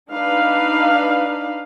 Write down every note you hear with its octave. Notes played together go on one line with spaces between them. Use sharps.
D4 D#4 B4 F5